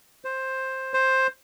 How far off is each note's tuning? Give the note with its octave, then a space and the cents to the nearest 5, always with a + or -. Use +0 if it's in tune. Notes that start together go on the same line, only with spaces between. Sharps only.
C5 +10
C5 +10